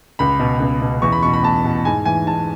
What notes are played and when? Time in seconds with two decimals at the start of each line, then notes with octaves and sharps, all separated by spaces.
0.19 C#2 B5
0.40 B2
0.60 C#2
0.82 B2
1.02 E2 C#6
1.12 B5
1.23 B2 C#6
1.33 B5
1.43 E2 A5
1.65 B2
1.85 G#2 G#5
2.06 E3 G#5
2.27 G#2 A5